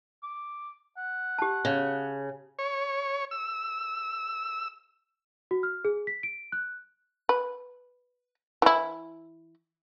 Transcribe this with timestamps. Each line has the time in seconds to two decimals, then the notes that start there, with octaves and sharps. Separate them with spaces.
0.23 D6
0.97 F#5
1.39 G4 A5
1.65 C#3
2.59 C#5
3.31 E6
5.51 F#4
5.63 F6
5.85 G#4
6.07 B6
6.23 D7
6.52 F#6
7.29 B4
8.62 E3 E4